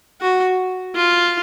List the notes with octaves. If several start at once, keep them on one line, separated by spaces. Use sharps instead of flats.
F#4
F4